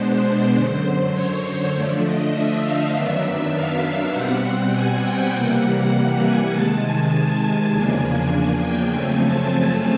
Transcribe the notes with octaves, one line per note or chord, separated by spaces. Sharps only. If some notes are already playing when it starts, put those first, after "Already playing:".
Already playing: B2 G#3 B3 D4 C5
F#2 D3 F#3 C5
C#5
D3 F3 A3 D4
D#5
E5
F5
F#2 D#3 F#3 B3 D4 E5
F5
B2 G3 C4 F#5
G#5
G5
C3 E3 G3 A#3 F#5
F#5
G#5
C3 D#3 G#3 A5
G#5
E2 C#3 F3 A#3 D4
G#5
G5
F#2 C#3 F3 A3 C4 G#5
A5
G#5